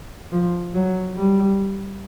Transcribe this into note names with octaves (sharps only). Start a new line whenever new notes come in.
F3
F#3
G3